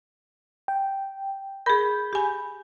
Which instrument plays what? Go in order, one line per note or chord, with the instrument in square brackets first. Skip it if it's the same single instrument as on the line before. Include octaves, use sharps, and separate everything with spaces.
[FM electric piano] G5
[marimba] G#4 A#4 [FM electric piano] B5 G6
[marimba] G4 G#5